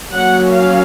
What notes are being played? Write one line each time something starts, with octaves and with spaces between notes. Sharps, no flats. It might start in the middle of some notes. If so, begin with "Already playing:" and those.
F#3 A#3 C#4 F#5
F5